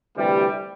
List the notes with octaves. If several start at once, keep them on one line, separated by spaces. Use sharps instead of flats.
D2 C3 E3 G3